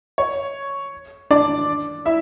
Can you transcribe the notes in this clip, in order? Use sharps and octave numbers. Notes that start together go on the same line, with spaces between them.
C#5
D4 D5
E4 E5